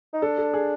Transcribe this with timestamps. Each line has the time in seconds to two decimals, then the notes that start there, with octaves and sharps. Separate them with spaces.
0.13 D#4
0.22 D4 A4
0.38 A4
0.54 G#4